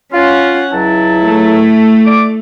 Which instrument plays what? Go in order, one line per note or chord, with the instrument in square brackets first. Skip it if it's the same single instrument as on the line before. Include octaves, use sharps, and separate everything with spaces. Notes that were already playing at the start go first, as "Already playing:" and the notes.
[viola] C#4 F#5 [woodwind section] F4
[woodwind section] C#2 F#3 A5 [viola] E4
[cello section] A3
[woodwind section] D5 D6